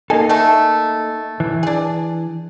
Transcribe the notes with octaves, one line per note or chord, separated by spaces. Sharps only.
A#3 D#4 A4 G#5
A3 E5 A5
E3
D4 G#4